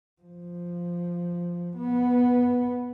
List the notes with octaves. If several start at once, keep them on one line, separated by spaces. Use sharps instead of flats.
F3
B3